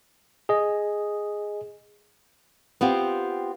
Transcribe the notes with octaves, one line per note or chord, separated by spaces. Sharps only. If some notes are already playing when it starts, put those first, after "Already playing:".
G#4 D#5
B3 C4 F4 G4